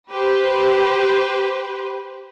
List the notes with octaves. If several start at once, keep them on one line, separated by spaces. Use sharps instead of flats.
G4 B4 C5